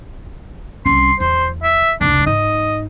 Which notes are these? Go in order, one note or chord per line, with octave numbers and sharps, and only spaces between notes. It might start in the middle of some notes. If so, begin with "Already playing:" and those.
C2 C#4 C6
E2 C5
E5
F1 C#2 D4
G#2 D#4 D#5